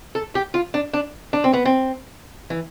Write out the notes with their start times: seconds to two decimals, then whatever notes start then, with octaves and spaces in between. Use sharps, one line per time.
0.15 A4
0.35 G4
0.54 F4
0.74 D4
0.93 D4
1.33 D4
1.44 C4
1.53 B3
1.65 C4
2.50 E3